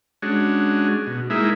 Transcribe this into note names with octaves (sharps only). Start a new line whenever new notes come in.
G#3 C#4 D4 F#4
B2
G#3 A#3 D#4 E4 G#4 E5